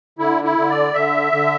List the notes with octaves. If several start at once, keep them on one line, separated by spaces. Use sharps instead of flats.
D3 E4
E4
D3
D5
D3 E5
D3